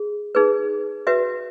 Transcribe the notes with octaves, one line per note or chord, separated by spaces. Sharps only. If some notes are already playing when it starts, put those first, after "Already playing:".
Already playing: G#4
D#4 G#4 B4
F#4 B4 E5